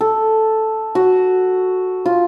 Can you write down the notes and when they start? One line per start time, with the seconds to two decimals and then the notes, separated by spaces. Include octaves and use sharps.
0.01 A4
0.95 F#4
2.06 F4